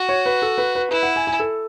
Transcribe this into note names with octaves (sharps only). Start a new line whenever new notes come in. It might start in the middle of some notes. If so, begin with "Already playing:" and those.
Already playing: F#4
C#5
B4
A4
B4
B4
E4 B4
F#5
G#5
G#5
A4